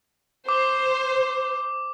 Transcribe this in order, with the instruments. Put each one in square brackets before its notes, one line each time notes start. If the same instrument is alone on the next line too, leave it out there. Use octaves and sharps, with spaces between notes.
[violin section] C5 [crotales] D6